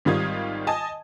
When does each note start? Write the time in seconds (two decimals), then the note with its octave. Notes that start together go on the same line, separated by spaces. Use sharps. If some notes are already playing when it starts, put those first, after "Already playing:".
0.05 G#1 D#3 G3 F4 D#6 G#6
0.67 D#5 G#5 A5 D#6